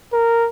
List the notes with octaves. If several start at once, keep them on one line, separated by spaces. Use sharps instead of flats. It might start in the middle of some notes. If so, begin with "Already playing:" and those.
A#4